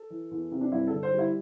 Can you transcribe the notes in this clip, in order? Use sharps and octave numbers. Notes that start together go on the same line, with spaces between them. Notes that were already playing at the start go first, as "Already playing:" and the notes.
Already playing: A4
E3
E2
C3
D4
G2 E4
D3 A4
C5
G3
E4